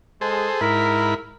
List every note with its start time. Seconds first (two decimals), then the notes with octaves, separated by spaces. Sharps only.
0.21 G#3 G#4 A4 C5
0.61 G#2 E4 A#4 B5